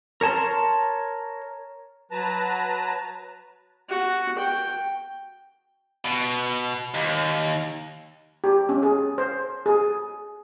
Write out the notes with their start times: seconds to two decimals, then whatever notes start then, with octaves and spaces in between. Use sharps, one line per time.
0.21 A#4 C#5 A5 C6
2.11 F#3 B4 A5 A#5
3.89 F#4
4.39 G5
6.05 B2
6.95 D#2
8.44 G4
8.69 C#4
8.83 G#4
9.18 C5
9.66 G#4